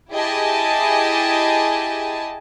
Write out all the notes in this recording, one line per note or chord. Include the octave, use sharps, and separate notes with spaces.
E4 G4 G#4 D#5 G#5 A5